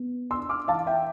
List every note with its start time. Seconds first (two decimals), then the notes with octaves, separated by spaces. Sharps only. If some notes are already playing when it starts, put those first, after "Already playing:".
Already playing: B3
0.31 D4 C6 E6
0.49 D6 F6
0.68 E3 F5 A5
0.87 E5 G5